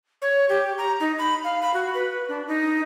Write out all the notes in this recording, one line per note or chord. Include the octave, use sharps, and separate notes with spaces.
C#5
G4
A#5
D#4
B5
F5
B5
F#4
B4
D4
D#4